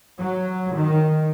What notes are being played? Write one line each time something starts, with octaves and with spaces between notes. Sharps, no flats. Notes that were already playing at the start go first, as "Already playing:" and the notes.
F#3
D#3